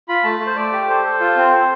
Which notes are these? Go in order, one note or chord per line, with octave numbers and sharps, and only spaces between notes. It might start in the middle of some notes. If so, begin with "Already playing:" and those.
F4 B5
A3 A5
A3
C5
A3 D5
G4
A4 C5
A4
F4
C4
A4